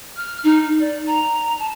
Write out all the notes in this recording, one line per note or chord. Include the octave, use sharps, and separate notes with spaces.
F6
D#4
D5
A#5
A5